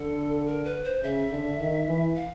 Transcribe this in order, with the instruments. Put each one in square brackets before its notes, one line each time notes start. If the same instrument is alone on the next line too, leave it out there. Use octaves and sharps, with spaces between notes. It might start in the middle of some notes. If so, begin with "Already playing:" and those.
Already playing: [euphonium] D3 [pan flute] A4
[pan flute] A#4
B4
C5
[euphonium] C#3 [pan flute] E5
[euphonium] D3
D#3
E3
[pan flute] F5